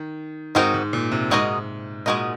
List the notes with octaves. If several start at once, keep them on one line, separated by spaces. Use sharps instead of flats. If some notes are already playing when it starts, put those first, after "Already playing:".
Already playing: D#3
G#2 C4 D#4 F#4 A#4 D#5
G#2
A#2
C3
G#2 G#3 D#4 F#4 A#4 D#5
A#2 G#3 D#4 F#4 A#4 D#5